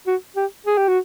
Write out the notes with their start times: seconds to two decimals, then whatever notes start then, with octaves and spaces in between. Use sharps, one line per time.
0.07 F#4
0.36 G4
0.67 G#4
0.77 G4
0.88 F#4